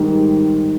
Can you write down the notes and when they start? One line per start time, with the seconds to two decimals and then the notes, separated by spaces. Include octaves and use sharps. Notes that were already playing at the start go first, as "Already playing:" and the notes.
Already playing: G#2 D#3 G3